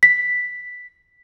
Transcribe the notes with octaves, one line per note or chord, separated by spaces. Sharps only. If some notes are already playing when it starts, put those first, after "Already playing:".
B6